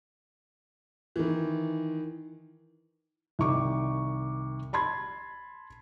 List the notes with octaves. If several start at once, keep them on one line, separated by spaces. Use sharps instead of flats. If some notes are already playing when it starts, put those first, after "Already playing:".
D#3 E3
C2 D#3 C#6 D6
A5 B5 C6 G#6